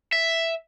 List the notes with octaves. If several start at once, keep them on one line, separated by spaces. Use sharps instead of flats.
E5